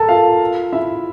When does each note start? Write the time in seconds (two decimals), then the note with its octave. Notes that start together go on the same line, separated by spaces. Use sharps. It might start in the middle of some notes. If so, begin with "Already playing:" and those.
Already playing: A4 A#4 A5 A#5
0.09 F4 F5
0.73 E4 E5